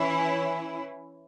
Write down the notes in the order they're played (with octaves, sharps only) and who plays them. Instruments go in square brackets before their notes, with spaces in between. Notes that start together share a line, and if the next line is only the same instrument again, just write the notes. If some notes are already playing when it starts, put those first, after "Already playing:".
Already playing: [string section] E3 C#4 E4